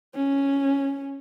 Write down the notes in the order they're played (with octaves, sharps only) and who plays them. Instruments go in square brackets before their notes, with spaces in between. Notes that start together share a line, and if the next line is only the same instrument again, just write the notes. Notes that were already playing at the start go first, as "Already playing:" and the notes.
[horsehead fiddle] C#4